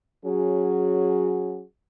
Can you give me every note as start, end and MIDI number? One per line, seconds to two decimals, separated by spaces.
0.24 1.63 54
0.24 1.63 61
0.24 1.63 66
0.24 1.63 68